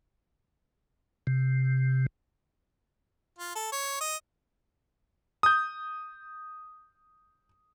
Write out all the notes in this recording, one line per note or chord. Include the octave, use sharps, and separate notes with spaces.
C3
F4
A4
C#5
D#5
D#6 G6